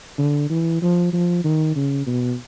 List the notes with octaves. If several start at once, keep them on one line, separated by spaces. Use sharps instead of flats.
D3
E3
F3
F3
D#3
C#3
B2